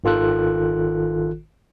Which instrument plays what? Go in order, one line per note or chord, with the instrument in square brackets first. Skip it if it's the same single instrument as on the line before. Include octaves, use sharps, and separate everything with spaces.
[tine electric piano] G#1 D#3 F4 A4 F#6